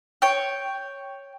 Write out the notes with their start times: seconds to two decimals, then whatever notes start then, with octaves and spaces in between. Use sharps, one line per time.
0.22 C#5 G5